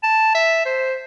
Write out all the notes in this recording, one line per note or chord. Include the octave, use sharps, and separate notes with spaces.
A5
E5
C5